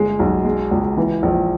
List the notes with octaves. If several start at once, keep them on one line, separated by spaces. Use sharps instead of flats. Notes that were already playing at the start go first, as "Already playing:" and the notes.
Already playing: G1 G#3
B1
G#3
C#2
E3
A#1